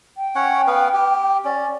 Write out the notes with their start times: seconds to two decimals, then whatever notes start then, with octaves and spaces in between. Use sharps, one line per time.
0.17 G5
0.36 C#4 C#5 F#5
0.67 B3 B4 F5
0.94 G4
1.44 C#4 D5